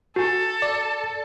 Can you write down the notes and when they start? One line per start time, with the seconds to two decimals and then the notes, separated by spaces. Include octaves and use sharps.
0.16 F#4 A4 G#5
0.62 D5